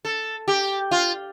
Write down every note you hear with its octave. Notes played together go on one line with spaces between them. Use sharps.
A4
G4
F4